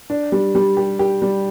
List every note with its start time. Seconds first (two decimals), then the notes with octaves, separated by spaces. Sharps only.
0.10 D4
0.32 G3
0.55 G3
0.77 G4
0.99 G4
1.22 G3